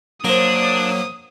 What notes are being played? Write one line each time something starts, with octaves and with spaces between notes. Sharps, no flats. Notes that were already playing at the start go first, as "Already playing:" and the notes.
F#3 A#3 D4 A#4 C5 D#6